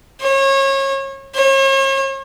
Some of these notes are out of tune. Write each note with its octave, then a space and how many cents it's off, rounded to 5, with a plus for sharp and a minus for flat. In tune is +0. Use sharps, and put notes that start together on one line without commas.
C#5 -30
C#5 -40